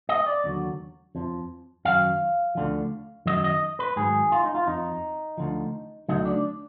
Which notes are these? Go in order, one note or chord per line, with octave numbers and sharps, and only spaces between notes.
D#5
D5
D#2 D3 F#3
F2 F3
F#2 D#3 F#3 F5
D2 D3 F3
F#2 D#3 F#3 D#5
D#5
B4
G#2 D#3 F#3 G#4
F4
D#4
F4
F2 F3 D#4
D2 D3 F3
D2 D3 F#3 D#4
D4